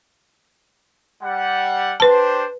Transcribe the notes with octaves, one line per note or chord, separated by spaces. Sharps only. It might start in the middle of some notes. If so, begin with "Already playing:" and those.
G3 F#5
D4 G4 B4 C5 A5